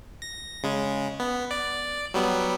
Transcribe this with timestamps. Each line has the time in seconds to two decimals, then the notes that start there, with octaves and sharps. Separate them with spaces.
0.22 A#6
0.63 C#3 G#3
1.20 B3
1.51 D5
2.14 F#3 G3 B3